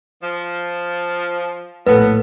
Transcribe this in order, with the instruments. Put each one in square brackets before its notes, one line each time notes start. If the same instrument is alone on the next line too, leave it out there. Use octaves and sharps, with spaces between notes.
[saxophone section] F3
[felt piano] A#1 A2 A4 [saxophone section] B3 [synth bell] B4